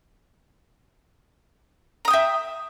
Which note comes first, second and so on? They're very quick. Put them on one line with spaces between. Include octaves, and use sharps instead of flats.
A#5 D#6 G5 E5